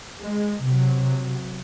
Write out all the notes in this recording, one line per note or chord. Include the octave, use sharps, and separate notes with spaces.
G#3
C3 F#3